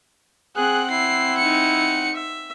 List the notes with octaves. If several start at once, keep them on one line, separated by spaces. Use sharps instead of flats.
C4 G#4 F#5 F#6
E4 C7
D#4 C#7
E5